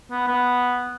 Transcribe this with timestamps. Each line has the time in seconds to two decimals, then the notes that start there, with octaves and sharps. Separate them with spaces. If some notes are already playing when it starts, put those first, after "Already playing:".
0.11 B3
0.28 B3